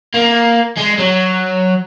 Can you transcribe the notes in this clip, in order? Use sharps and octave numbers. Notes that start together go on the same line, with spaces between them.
A#3
G#3
F#3